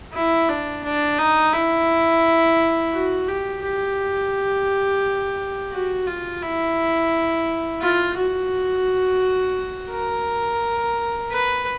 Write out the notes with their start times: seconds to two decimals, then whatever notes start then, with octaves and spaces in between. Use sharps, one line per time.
0.13 E4
0.49 D4
0.84 D4
1.19 D#4
1.53 E4
2.93 F#4
3.28 G4
3.63 G4
5.72 F#4
6.07 F4
6.42 E4
7.82 F4
8.17 F#4
9.91 A#4
11.31 B4